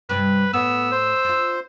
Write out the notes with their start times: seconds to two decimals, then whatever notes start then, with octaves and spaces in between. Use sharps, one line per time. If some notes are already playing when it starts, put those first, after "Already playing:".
0.09 G2 C3 D4 B4
0.54 A2 B3 E6
0.91 C5
1.25 D4 F4